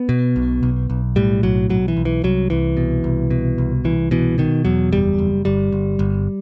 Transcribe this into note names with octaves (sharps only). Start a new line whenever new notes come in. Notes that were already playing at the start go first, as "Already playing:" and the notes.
Already playing: B3
B2
B1
B1
B1
A2 G3
B1 F#3
B1 F#3
E3
B1
E3
C2 F#3
C2 E3
B2
C2
B2
C2
C2 E3
B2 E3
B2 D#3
E2 F#3
F#1 G3
F#1
G1 G3
G1
G1